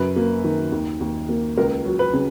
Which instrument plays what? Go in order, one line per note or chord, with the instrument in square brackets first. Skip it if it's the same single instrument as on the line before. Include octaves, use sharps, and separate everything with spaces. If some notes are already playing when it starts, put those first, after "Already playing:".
Already playing: [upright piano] F#2 C#3 B4
A#3
D#3
D#2
D#2
A#3
C#2 A#4
F#3
B4
C#3